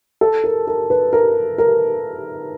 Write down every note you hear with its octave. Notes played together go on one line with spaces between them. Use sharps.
A4
A#4
A#4
B4
A#4
A#4